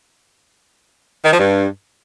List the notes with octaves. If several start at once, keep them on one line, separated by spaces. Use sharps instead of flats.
D#3
F3
G2